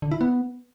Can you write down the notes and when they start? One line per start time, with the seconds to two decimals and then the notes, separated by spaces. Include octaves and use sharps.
0.02 D3
0.11 E4
0.21 B3